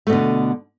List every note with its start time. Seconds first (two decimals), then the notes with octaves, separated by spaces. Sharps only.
0.07 A3
0.10 B2
0.12 D3